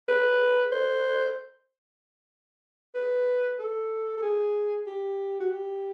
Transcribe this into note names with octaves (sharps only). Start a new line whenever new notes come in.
B4
C5
B4
A4
A4
G#4
G4
F#4
G4